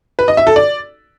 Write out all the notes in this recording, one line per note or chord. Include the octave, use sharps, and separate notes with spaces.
B4
D#5
E5
A4
D5